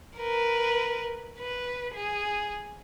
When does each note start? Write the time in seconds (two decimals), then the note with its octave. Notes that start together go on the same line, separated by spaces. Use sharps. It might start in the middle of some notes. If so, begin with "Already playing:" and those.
0.17 A#4 B4
1.40 B4
1.95 G#4